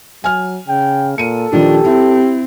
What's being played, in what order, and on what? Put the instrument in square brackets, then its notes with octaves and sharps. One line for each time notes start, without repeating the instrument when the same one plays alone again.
[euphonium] F#3 [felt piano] G#5 F6
[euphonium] C#3 [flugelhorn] G5
[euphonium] A#2 [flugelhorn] A4 [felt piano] C#7 D#7
[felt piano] A#2 D#3 F3 [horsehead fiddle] D4 [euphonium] G4
[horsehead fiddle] C4 [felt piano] E4